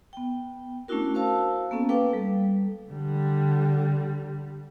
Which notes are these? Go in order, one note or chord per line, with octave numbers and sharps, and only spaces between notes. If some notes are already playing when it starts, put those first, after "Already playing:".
B3 G5
A3 C#4 D4 E4 F#4 A#4
F#4 A#4 C5 F5 A5 E6
A#3 B3 C#4 A4
A#3 A4 B4 F5 G5 D6
G3 A4
D3 G3